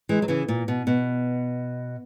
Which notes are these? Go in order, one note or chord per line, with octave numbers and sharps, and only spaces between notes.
E3 G#3
F#3
C#3 E3
A#2
B2
B2